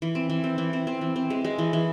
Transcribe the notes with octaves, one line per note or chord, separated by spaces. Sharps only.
E3
C4
E3
C4
E3
C4
C4
E3
C4
G#3
G#3
E3
E3